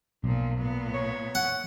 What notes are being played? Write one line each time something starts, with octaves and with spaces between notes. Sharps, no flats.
B1 A#2 F3
A#2 B3
C#5
F#5